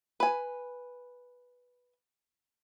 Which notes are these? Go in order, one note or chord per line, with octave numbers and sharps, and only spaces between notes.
B4 G#5